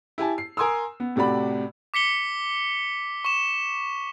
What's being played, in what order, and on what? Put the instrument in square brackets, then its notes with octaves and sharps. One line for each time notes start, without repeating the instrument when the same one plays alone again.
[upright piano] E4 G4 G#5 A5
C7
A#4 G#5 C6 D#6 E6
B3
A2 C3 F#4 D5 B5
[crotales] D6 B6 C#7 G7
C#6 E7